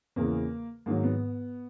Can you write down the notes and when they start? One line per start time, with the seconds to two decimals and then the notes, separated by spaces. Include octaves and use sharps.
0.16 E2 C#3 E3 A#3
0.86 G#2 D#3 F#3 A#3
1.03 B3